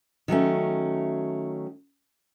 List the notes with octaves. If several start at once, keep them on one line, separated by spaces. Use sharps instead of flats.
D#3 F#3 A3 C#4